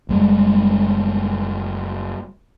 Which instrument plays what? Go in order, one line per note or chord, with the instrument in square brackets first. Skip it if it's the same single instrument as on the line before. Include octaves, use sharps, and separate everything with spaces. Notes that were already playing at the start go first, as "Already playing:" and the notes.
[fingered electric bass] F#1 G3 G#3